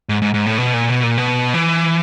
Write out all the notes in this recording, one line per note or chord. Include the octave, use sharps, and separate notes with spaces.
G#2
G#2
G#2
A2
B2
A#2
B2
A#2
B2
E3